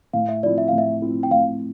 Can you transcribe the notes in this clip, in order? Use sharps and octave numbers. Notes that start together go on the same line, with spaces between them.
A2 F5
E5
F3 C4 E4 D5
E5
A2 F5
E5
F3 C4 E4
G5
A2 F5